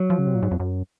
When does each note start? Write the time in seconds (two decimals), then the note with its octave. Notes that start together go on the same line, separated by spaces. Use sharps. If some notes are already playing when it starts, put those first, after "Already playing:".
Already playing: F#3
0.10 F3
0.19 C#3
0.27 C3
0.35 A#2
0.43 G#2
0.51 F2
0.60 F#2